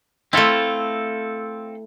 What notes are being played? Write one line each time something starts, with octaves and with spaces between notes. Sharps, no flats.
A3 C4 E4 F4 A4